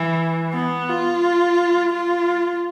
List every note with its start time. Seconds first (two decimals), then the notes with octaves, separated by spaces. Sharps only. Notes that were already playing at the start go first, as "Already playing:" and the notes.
Already playing: E3
0.53 B3
0.89 F4
1.92 F4